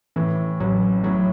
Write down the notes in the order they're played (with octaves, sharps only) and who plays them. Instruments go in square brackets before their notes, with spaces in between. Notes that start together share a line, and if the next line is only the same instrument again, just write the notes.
[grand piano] A2 [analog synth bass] E3
[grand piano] A1 [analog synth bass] F#3
[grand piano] A2 [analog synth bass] F#3